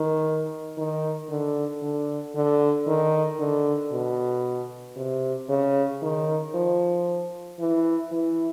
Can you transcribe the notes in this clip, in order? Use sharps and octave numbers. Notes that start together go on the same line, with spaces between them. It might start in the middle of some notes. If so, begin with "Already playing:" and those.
Already playing: D#3
D#3
D3
D3
D3
D#3
D3
B2
C3
C#3
D#3
F3
E3
E3